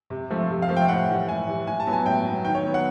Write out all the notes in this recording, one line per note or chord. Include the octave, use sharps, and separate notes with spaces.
C3
F3 A3 C4
C3
F5
F3 A3 C4
G5
A2 F#5
E3 G3
A2 G#5
E3 G3
A2 G#5
A5
F#3 B3
G#5
A2 G5
F#3 B3
D#3 G5
C#5
F#3 B3
F#5